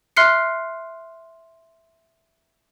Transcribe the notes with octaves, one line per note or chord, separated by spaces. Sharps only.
E5 C6 F6 F#6 C7 C#7